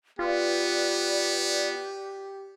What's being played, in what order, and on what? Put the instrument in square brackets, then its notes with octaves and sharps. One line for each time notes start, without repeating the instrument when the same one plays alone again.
[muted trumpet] B3 [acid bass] F4 [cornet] G4 [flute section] B4 D5